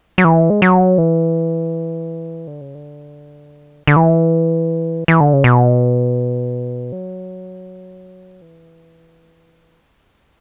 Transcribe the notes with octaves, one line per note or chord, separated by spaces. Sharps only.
F#3
E3
G#3
F#3
E3
D3
C#3
D3
D3
E3
E3
D3
C#3
B2
F#3
E3